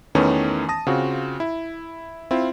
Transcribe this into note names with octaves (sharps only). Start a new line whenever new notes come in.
E2 D#3 E3 A3 B3 C#4
A5 D#6 A#6
C#3 C4 F4 F#4
E4
C4 E4 F4